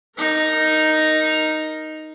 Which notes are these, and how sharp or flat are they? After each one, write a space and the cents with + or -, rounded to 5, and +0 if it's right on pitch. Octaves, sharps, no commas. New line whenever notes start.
D#4 +0 A#4 +0